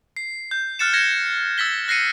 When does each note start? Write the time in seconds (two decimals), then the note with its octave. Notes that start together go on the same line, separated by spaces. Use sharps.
0.17 C7
0.51 G6
0.79 F6 F#6 A6 C#7 E7
0.93 G#6 A#6 C#7 E7
1.58 E6 A6 B6 G7
1.88 F#6 A#6 C7 C#7 D#7